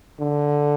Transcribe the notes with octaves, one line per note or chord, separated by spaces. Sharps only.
D3